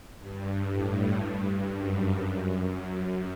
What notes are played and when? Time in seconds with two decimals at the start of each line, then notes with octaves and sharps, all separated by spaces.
0.18 G2
0.70 A2
1.22 G2
1.73 F#2
2.24 F#2
2.76 F#2